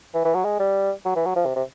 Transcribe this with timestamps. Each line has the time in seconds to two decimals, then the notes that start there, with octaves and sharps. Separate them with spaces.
0.14 E3
0.25 E3
0.35 F#3
0.44 G#3
0.59 G3
1.05 F#3
1.16 E3
1.26 F#3
1.36 F3
1.45 C3
1.56 C3